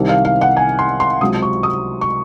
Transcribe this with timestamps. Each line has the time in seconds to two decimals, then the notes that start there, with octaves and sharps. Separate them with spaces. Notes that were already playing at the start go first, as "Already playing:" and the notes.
Already playing: C2 C3 D#3
0.09 F5
0.25 F5
0.41 F#5
0.57 G#5
0.79 C6
1.00 C6
1.21 C#2 C3 F#3 C4 D#6
1.42 C#6
1.63 D#6
2.01 C#6